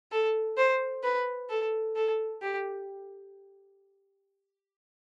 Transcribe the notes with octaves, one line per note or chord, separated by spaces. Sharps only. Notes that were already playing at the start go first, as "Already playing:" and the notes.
A4
C5
B4
A4
A4
G4